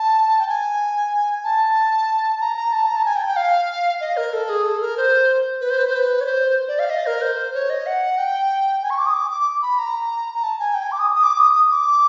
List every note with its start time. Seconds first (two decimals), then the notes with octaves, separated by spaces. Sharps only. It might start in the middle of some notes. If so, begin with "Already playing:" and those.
Already playing: A5
0.40 G5
0.48 G#5
1.44 A5
2.41 A#5
2.56 A#5
2.73 A5
2.87 A#5
2.96 A5
3.05 G#5
3.16 G5
3.26 G5
3.36 F5
4.01 D#5
4.17 A#4
4.33 A4
4.49 G#4
4.65 A4
4.81 A#4
4.97 C5
5.61 B4
5.70 C5
5.79 B4
5.87 C5
5.96 B4
6.21 C#5
6.26 C5
6.68 D5
6.79 F5
6.90 D#5
7.06 A#4
7.22 C5
7.54 C#5
7.70 D#5
7.86 F#5
8.18 G5
8.83 G#5
8.90 C#6
8.99 D6
9.06 D#6
9.14 D6
9.30 D6
9.63 B5
9.79 A#5
10.35 A#5
10.43 A5
10.59 G#5
10.74 G5
10.83 G#5
10.92 D6
10.99 D#6
11.16 D#6
11.23 D6
11.39 D#6
11.55 D#6
11.71 D6